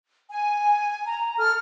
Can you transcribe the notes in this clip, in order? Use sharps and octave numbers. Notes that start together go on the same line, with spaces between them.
G#5
A#5
A4 F6